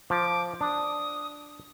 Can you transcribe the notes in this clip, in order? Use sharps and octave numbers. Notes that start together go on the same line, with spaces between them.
F3 D6
D4 D#6